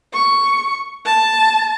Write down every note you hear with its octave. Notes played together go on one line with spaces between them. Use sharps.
C#6
A5